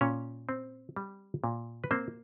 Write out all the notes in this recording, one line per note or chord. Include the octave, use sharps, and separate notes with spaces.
A#2 C#4 C#5
C4
G3
A#2
B4
A#3 C4 C5